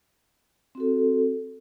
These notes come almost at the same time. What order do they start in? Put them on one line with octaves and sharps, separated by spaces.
C4 F#4 A4